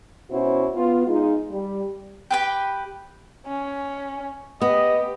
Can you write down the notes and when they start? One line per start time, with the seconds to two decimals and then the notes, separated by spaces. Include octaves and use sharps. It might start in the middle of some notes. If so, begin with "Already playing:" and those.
0.31 B2 C#4 E4 F#4 C5
0.75 B3 F4
1.07 G#3 D#4 F4
1.51 G3
2.31 G4 B4 G5
3.46 C#4
4.62 B3 G4 D#5